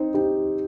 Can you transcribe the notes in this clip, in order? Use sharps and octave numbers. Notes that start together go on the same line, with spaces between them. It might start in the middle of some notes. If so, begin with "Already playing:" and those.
Already playing: C4 D#4
D#4 G4